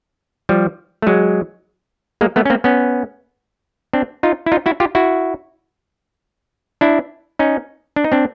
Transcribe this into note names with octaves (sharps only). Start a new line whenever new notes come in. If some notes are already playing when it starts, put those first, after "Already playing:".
F3 G3
A3
F#3 G#3
G#3 A#3
A3 B3
C#4
A#3 C4
B3 C#4
C4 D4
D#4 F4
E4
D#4 F4
E4 F#4
F4 G4
E4 F#4
D4 E4
C#4 D#4
D4
D#4
C4 D4